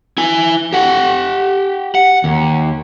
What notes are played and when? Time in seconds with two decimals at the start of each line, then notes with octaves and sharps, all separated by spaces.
0.18 E4 G#5
0.73 G4 F#5
1.95 F#5
2.24 D#2